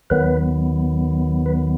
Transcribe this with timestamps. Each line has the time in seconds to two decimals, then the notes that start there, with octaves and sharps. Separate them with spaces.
0.10 D#2 D#3 F#3 B3 B4
1.46 B4